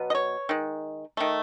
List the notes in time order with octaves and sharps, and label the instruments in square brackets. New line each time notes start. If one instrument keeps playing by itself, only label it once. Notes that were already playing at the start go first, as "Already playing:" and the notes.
Already playing: [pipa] B2 F#3 B3
D#5
C#5
D#3 G#3
D#3 A3